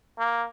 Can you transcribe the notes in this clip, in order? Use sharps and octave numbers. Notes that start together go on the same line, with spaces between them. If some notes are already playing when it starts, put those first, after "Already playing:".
A#3